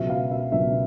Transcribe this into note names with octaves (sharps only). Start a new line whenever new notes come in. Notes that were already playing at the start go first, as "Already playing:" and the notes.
Already playing: C#2 B2 F#3 E5
F5
E5
C#2 B2 F#3 E5